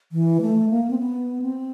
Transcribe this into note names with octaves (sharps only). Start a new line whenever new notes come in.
E3
A3
A#3
C4
B3
C4